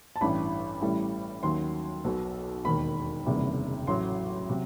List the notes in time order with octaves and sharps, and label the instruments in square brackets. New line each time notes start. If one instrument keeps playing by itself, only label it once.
[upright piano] A5
A1 G2 E3 G3 B5
A1 A2 E3 G3
D#2 D#3 F#3 C6
B1 B2 F#3
E1 D#2 D#3 B5
F#1 E2 C3 D#3 G3
A1 A2 F#3 C6
C3 F#3